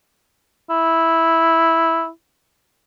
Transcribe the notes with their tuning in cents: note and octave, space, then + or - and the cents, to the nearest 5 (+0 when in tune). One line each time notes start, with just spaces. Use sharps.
E4 -5